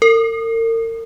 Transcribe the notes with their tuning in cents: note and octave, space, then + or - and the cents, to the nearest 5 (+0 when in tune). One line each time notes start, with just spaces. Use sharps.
A#4 -40